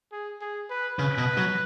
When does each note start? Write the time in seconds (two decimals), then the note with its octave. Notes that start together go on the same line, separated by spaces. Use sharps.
0.12 G#4
0.41 G#4
0.70 B4
0.98 C#3 B4
1.18 B2
1.37 F#3